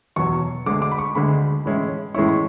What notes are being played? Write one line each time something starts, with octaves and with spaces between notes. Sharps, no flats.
E2 B2 F#3 C#6
D2 D3 G#3 D6
D6
B5
C#6
D2 D3 G#3 B5
A2 E3 G#3 C#4 E4
A2 E3 G#3 C#4 E4 C#6
C#6